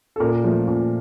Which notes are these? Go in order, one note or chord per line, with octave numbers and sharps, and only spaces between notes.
A4
A#2 A#4
F3 A3
A#2